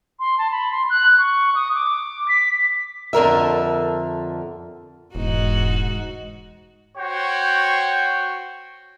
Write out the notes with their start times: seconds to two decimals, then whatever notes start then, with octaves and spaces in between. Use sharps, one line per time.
0.19 C6
0.38 A5
0.51 B5
0.71 C6
0.90 F#6
1.18 C#6
1.55 D#6
1.75 D6
2.28 B6
3.13 F2 D3 A#4 E5
5.15 E1 G#2 D#4 F#4
6.97 F#4 C5 C#5 G5